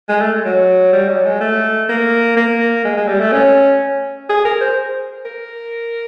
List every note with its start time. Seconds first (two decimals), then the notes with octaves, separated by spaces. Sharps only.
0.09 G#3
0.20 A3
0.45 F#3
0.93 G3
1.09 F#3
1.24 G#3
1.41 A3
1.89 A#3
2.37 A#3
2.84 G#3
2.97 G#3
3.08 G3
3.20 A3
3.32 C#4
4.29 G#4
4.45 A#4
4.61 C5
5.25 A#4